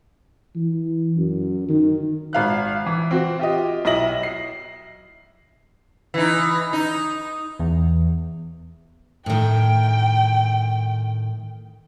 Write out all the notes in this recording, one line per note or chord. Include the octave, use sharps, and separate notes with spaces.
E3
F#2
D#3
G#1 F5 F#6
E3
C4 F#4
F4 G4 D#5
B1 E4 D#5 A#6 F#7
C7
E3 D#4
D#4
E2
A2 D#3 G5